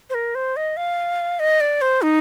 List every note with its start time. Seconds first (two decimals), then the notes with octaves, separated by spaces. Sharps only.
0.10 C5
0.14 A#4
0.35 C5
0.56 D#5
0.77 F5
1.39 D#5
1.60 D5
1.81 C5
2.02 D#4